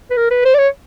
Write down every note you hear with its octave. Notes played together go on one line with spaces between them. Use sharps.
B4
A#4
B4
C5
D5
C#5